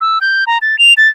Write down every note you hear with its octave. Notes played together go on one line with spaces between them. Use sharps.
E6
G6
A#5
A6
F7
A6